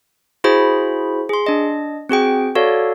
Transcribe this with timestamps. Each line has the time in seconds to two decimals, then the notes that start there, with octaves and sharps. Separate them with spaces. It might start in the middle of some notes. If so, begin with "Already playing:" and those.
0.44 E4 F#4 G#4 C5 B5
1.29 G#4 C6
1.46 D4 D#5
2.09 C4 F#4 G#4 G5
2.55 F#4 A4 C#5 D5 F5